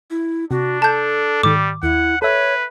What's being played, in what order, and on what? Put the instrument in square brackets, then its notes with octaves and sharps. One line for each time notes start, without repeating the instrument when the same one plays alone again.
[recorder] E4
[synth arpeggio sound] C3 [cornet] D4 [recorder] F#4
[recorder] A4 [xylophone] A5 G6
[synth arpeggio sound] G#2 D#3 [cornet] G3 [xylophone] D6
[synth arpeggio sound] D#2 [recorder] E4 [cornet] F#5
[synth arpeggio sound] A4 E5 [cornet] B4 [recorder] C#5